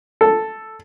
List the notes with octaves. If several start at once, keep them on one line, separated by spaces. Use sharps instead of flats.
A4